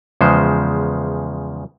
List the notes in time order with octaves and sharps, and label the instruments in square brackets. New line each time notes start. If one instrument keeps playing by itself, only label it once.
[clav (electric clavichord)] E2 C#3 F3 G#3 C5